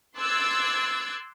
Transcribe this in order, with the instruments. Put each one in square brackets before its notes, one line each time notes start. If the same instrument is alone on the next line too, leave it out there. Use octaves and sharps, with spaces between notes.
[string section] C6 D6 E6 F#6 G#6 A6